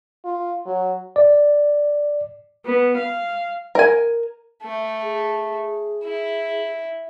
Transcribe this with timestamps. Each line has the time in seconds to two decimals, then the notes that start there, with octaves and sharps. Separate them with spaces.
0.25 F4
0.66 F#3
1.16 D5
2.65 B3
2.97 F5
3.75 A#4 G#5
4.63 A3
5.03 G#4
6.04 E4